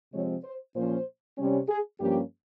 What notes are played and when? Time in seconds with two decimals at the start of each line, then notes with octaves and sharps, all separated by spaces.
0.14 C3 F3 G#3 C4 C#5
0.44 C5
0.75 A#2 F3 A#3 C#4 C5
1.38 C3 G3 C#4
1.68 G#4
1.99 G2 F3 A#3 C#4 G4